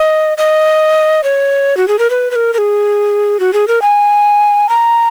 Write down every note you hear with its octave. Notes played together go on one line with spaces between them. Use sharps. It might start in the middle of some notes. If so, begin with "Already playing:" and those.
Already playing: D#5
D#5
C#5
F#4
G#4
A#4
B4
B4
A#4
A#4
G#4
F#4
G#4
A#4
G#5
A#5